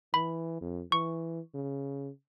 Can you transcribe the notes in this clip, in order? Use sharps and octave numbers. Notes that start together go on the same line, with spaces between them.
E3 B5
F2
E3 C#6
C#3